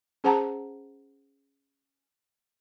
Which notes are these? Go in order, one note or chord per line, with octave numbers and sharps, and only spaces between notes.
C#4 G#4 C5 F#5 A5 A#5